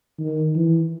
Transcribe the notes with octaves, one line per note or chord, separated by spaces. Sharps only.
D#3
E3